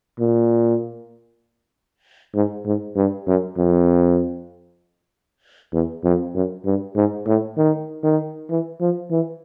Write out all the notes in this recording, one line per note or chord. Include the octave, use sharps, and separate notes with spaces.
A#2
G#2
G#2
G2
F#2
F2
E2
F2
F#2
G2
G#2
A2
D#3
D#3
E3
F3
E3